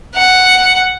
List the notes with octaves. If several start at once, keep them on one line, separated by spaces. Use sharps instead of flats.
F#5